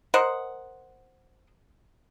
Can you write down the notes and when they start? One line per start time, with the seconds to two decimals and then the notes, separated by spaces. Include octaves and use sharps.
0.14 A#4 C5 D#5 F#5